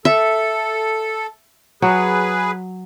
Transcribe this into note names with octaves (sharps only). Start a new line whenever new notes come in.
A4 E5
F#3 G#4 B4